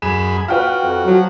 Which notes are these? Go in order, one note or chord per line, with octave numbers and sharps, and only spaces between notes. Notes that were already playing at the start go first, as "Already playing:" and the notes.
F#2 G#4 B5 E7
F4 F#4 B4 G5 F6
F2
F3 F#3